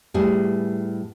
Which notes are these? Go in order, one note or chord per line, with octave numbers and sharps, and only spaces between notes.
A2 G3 B3 G#4